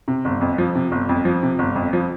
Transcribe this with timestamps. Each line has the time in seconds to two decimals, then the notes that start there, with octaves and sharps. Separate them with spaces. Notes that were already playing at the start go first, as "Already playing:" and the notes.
0.08 C3
0.25 G1
0.41 F2
0.58 F3
0.75 C3
0.92 G1
1.09 F2
1.25 F3
1.43 C3
1.59 G1
1.75 F2
1.93 F3